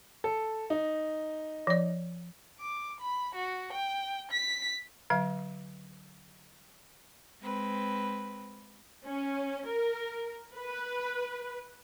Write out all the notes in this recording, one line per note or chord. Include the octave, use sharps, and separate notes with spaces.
A4
D#4
F3 D5
D6
B5
F#4
G5
B6
D3 F#3 F5
G#3 C4 B4
C#4
A#4
B4